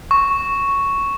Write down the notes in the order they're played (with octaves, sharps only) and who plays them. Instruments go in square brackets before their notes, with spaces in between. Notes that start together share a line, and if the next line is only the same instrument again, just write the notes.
[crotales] C#6